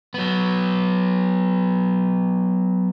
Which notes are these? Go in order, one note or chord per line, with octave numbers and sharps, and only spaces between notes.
F#3 B3